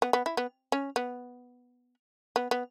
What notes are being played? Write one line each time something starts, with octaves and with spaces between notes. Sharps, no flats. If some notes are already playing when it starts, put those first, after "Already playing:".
B3
B3
E4
B3
C#4
B3
B3
B3